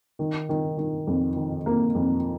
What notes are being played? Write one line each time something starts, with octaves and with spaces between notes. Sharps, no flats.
D#3
D#3
D#3
F2
D#3
A#3
F2